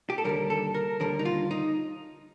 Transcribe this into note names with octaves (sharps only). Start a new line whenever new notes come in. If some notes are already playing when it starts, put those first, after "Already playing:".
G4
A4
D#2 D3 G3 A#4
A4
A#4
D#2 D3 G3 A#4
D#4
F4
D#4